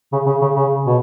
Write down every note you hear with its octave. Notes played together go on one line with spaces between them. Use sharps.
C#3
C#3
C#3
C#3
B2